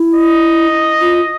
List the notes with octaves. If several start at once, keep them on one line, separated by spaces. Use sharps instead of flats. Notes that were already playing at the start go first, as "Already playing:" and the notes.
Already playing: E4
D#5
F4